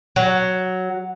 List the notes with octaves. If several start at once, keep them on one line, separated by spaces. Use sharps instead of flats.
F#3